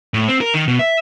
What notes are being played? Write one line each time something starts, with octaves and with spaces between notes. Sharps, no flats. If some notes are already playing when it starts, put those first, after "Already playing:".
A2
C4
A#4
D#3
B2
E5